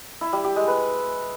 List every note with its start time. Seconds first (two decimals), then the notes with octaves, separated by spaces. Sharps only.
0.21 E4
0.33 G3
0.44 G4
0.56 G#3
0.68 B4